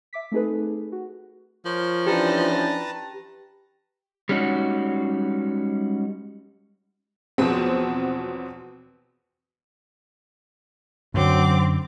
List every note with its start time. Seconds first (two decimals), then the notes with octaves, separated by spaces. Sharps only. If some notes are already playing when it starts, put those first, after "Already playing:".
0.13 E5 D6 B6
0.32 A3 C4 D#4 G#4 A4 B4
0.92 F#4
1.65 F3 A#4 C#5
2.07 E3 C#4 D4 G4 B4 A5 A#5
4.29 G3 G#3 C#4 D#4 F#4
7.38 E2 B2 F3 F#3 B3 C4
11.14 F#2 D3 F#3 C4 D6